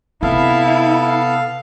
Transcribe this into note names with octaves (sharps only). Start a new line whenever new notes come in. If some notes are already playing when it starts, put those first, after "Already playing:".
C3 B3 E4 A4 F5